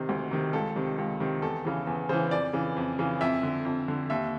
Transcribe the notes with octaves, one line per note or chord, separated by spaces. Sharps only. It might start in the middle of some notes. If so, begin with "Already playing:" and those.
Already playing: C3 D#3
D2
C3 D#3
C#2 A4
C3 D#3
C#2
C3 D#3
E2 A4
C#3 E3
E2
C#3 E3 C5
F2 D5
C#3 E3
F2
C#3 E3
F2 E5
D3
F2
D3
D#2 E5